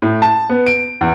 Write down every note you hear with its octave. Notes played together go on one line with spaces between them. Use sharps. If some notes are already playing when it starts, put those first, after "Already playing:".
A2
A5
B3
D7
E2